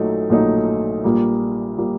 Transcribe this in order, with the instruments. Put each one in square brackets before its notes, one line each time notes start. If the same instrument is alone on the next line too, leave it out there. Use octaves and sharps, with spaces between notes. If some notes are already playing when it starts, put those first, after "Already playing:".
Already playing: [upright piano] A#1 A#2 F#3 A3 D#4
A#1 A#2 F#3 A3 D#4
A#1 A#2 G3 A#3
A#2 G3 A#3